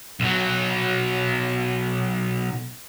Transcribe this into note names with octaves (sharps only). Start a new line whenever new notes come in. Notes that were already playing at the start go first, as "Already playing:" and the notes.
B1 F#3